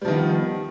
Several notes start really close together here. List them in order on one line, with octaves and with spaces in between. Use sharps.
G3 F3 D#3 B3